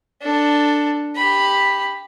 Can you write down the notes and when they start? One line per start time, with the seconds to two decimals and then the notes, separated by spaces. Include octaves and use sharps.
0.22 D4 A4
1.16 G4 B5